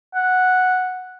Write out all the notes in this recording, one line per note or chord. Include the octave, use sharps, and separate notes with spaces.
F#5